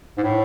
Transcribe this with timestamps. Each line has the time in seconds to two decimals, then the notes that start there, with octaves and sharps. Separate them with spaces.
0.18 G#2
0.24 A2